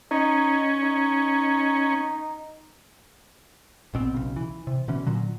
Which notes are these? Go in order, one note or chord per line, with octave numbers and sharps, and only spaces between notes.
C#4 D#4
D#4
A#1 B2 C4
B1 C#3
E3
C3
B2 D3 E3 C#4
A#2 D3 F#3